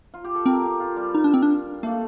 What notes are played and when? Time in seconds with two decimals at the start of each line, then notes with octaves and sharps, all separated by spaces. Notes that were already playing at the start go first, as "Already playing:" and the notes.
0.14 F4
0.24 G4
0.35 A4
0.46 C4 A#4
0.62 G4
0.80 F4
0.96 G3
1.14 D#4
1.24 D4
1.34 C4
1.43 D4
1.83 A3 A#3